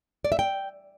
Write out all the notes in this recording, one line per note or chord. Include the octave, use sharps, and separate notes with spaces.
D5
E5
G5